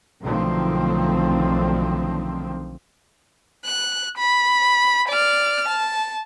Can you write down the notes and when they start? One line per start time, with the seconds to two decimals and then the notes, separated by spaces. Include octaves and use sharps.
0.23 B1 D3 D#3 F3 A3 C4
3.65 F#6
4.18 B5
5.09 D5 F6
5.69 A5